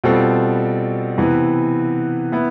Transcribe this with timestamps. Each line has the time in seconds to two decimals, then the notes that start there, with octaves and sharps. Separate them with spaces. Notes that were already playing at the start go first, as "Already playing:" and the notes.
0.04 B2 G3 C4 F4 A4
1.18 C3 E3 B3
2.32 B3 E4